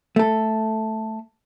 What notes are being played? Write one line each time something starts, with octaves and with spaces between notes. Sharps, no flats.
A3 A4